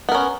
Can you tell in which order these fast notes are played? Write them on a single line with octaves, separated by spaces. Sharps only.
B3 A#4 C#4